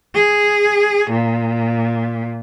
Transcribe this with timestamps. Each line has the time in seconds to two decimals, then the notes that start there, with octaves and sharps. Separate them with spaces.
0.13 G#4
1.09 A#2